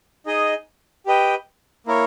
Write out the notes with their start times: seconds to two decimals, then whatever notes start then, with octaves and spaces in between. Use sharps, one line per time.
0.26 D#4 G#4 D#5
1.06 G4 B4 D#5 G5
1.86 A#3 E4 A#4 C#5